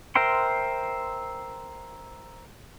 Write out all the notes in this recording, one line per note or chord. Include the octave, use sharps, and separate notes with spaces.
A#4 C5 E5 G5 C6